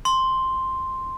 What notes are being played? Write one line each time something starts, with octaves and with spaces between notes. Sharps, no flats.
C6